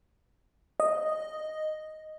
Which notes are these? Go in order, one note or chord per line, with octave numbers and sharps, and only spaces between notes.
D#5